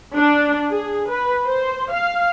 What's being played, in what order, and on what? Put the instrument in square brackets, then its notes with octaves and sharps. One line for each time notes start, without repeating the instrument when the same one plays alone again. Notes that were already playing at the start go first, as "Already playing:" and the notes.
[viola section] D4
G#4
B4
C5
F5